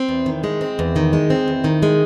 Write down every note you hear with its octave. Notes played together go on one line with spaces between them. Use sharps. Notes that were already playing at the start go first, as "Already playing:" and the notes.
Already playing: C4
E2
D#3
G#3
C4
E2
D#3
G#3
C4
E2
D#3
G#3